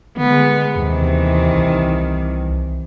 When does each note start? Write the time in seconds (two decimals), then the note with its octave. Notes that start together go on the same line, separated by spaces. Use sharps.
0.17 D3 G#3 B3
0.76 D#2 C3 D#3 E3
1.53 C2